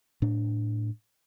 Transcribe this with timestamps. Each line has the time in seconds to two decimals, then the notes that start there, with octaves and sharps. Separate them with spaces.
0.22 A2 D4